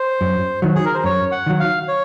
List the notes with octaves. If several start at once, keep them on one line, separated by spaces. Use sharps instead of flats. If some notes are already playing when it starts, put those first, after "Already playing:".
Already playing: C5
F#2
D#3 F#3
G#4
A#4
C5
F#2 C#5
F#5
D#3 F#3
F5
C#5